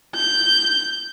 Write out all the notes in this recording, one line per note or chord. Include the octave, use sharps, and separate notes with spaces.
G6